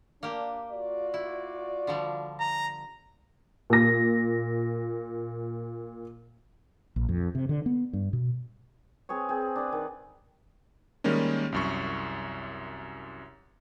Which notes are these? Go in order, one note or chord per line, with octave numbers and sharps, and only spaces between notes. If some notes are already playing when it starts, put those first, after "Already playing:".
A#3 D4 G4
F4 F#4 D5
E4
D3 F3 G3
A#5
A#2 A#6
A#1
F2
C3
D3
B3
G2
B2
C4 G#4 B4 C#5
C4 G#4
D4 B4
D#3
D#3 G3 G#3 A#3 C#4
C2 F#2 C#6